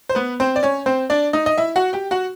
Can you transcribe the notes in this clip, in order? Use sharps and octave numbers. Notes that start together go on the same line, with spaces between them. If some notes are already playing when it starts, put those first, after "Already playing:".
C5
B3 B4
C4 C5
D5
C#4 C#5
C4 C5
D4 D5
D#4 D#5
D#5
E4 E5
F#4 F#5
G4 G5
F#4 F#5